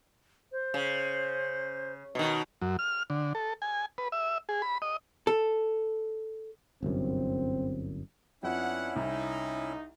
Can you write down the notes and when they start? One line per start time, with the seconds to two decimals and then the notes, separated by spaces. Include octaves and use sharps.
0.52 C5
0.74 C#3
2.15 B2 D#3
2.61 F#2
2.79 F6
3.10 D3
3.35 A4
3.62 G#5
3.98 B4
4.12 E5
4.49 G#4
4.62 B5
4.82 D#5
5.27 A4
6.83 G1 C2 F#2 C4
8.43 F2 F3 B3 C#4 D4 E4 F#5
8.96 C2 D#4